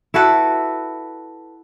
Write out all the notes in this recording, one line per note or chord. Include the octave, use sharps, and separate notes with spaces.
E4 F#4 A4 B4